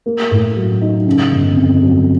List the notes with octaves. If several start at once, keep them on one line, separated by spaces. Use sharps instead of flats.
A#3
A2
F#3
D#4
C#3
G1
F2
F#3